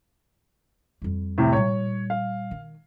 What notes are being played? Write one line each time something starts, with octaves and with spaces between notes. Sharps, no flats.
F2 G3
A2 C3
A#2 G3 C#5
F5
D#3